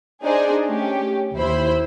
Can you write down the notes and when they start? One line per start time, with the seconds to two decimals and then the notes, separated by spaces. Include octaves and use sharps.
0.22 D4 D#4 G#4 C5 D5 D#5
0.65 A3 C#4 G4
1.35 D#2 E4 C5 B5